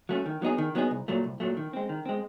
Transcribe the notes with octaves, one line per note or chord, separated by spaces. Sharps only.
F#3 A3 C#4
D#3
F#3 B3 D#4 G#4
D#3
F#3 B3 D#4 G#4
C2
A#2 F#3 A3
C2
A#2 F#3 A3
D#3
G#3 C4
D#3
G#3 C4